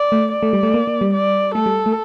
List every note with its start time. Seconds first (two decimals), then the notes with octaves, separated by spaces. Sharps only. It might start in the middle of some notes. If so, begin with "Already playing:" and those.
Already playing: D5
0.12 A3
0.32 D5
0.43 A3
0.53 G3
0.63 A3
0.74 A#3
0.87 A#3
1.01 G3
1.14 D5
1.55 A3 A4
1.66 G3
1.86 A3